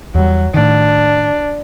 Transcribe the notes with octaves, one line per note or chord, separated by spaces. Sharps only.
E2 F#3 G3
A2 D#3 D4